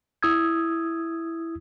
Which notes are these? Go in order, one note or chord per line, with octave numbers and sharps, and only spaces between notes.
E4 D#6 E6 G#6